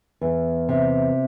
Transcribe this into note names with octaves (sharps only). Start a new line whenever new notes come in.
E2
C3